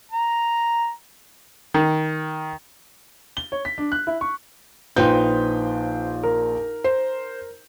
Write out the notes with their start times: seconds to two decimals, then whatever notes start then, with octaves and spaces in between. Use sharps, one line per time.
0.11 A#5
1.74 D#3
3.37 G7
3.52 C#5
3.65 B6
3.78 D4
3.92 F#6
4.07 E4
4.21 C#6
4.96 A#1 D#4 F4 B4 C5 G5 G6
6.23 A#4
6.84 C5